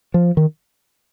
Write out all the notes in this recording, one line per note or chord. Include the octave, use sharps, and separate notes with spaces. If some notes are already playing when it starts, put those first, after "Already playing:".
F3
D#3